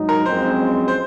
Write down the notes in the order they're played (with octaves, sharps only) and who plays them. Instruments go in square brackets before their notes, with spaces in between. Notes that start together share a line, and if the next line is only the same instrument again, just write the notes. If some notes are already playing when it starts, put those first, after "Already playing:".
Already playing: [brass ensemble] G#2 F#3 D#4
[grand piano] A#4
[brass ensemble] F#1 F2 C#3 G#3 C4 [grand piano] C5
[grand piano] C5